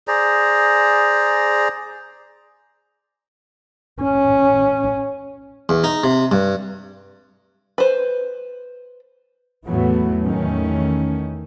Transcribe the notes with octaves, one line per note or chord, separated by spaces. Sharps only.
G#4 C5 D5 A#5
C#4
E2
D#4
C3
G2
B4 C5
E2 A2 E3 F#3 A3 B3
E2 D#3 A3 C#4